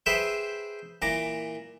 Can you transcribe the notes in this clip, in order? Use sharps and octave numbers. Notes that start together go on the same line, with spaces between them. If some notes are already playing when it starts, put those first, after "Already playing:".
G#4 B4 C5 E5 G5
A#2 E3 A#5 D6